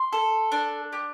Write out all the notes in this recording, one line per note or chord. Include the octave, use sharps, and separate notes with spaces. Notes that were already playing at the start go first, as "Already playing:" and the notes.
Already playing: C6
A4
D4
G4